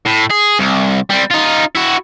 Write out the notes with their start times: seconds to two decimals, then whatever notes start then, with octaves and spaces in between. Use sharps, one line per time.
0.05 A2
0.30 G#4
0.60 C2
1.10 G3 C4
1.31 D#4 F4
1.75 E4 F#4